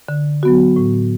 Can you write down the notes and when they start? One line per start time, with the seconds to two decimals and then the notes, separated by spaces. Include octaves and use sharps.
0.09 D3
0.43 F#3 B3 F#4
0.76 A2